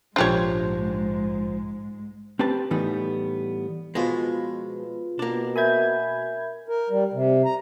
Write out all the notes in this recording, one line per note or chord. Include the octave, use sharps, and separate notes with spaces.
A#1 G#2 F3 G#3 D4 G4 C5 C#5
C4 G4 B4 A5
A2 E3 G3 B3 D#4
B2 F3 G#3 B3 F4 B4
B2 A#3 D4
A#4 E5 G#5 B5 G6 G#6
A#4
G3
C3
A#5